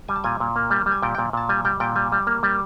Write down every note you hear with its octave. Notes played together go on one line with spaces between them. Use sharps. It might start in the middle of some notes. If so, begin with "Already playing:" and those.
G3 G#5
A5
A#2 G#5
A#2
A#3
G3
G3
G#5
A#2 G5
A#2 G5
A#2 A5
G3 G#5
G3 G5
A#2 G5
G3 G#5
G3
A#3
G3